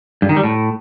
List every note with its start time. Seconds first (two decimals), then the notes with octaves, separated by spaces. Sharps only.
0.22 G2
0.29 D#3
0.36 G3
0.44 A2